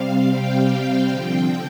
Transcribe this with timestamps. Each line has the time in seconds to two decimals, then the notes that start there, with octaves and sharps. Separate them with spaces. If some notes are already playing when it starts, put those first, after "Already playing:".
Already playing: C3 G3 C4 F5
0.35 G5
1.07 D3 F3 C4 G5